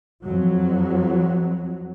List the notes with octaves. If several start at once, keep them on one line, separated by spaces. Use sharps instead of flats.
F2 F#3